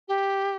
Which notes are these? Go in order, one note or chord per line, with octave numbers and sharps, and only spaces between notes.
G4